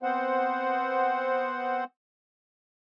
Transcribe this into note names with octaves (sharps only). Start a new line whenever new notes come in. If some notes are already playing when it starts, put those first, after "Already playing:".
B3 C4 C5 F#5